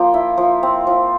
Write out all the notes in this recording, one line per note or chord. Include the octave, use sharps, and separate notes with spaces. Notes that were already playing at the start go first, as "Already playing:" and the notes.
Already playing: F3 A#3 G5 A#5
E4
F3
C4
F3